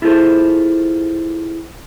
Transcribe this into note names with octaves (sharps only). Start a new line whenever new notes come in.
E4 F4 G#4 A4 C5